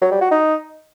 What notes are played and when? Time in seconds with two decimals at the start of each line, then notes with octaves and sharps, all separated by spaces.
0.02 F#3
0.11 G3
0.21 F#4
0.31 D#4